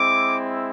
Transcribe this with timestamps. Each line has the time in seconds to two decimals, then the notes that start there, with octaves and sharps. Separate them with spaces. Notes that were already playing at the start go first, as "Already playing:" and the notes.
Already playing: G#3 C4 E4 D6